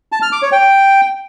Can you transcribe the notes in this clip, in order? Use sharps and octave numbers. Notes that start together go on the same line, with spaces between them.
A5
F6
D6
C#5
G5